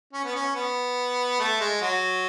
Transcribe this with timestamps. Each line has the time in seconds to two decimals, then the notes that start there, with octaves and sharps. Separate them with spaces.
0.13 C#4
0.24 B3
0.35 C#4
0.55 B3
1.39 A3
1.60 G#3
1.81 F#3